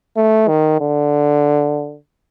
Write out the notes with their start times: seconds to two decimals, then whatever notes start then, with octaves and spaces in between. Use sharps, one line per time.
0.17 A3
0.48 D#3
0.81 D3